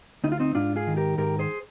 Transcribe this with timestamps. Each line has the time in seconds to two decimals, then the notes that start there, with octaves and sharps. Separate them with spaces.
0.24 D2 D#4
0.32 F4
0.40 C4 D#4
0.55 G#2 D4 F4
0.76 F4 G#4
0.87 D#3
0.97 G4 A#4
1.18 G#2 G4 A#4
1.39 G#4 C5